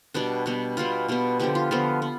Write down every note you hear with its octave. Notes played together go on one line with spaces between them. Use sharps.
B2 G3 B3 D4
B2 G3 B3
B2 G3 B3 F4
B2 G3 B3
D3 F3 B3 G4
F4
D3 F3 B3 F4
B3